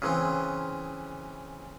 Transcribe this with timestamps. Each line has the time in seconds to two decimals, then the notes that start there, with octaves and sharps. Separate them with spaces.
0.02 C#3 E3 C4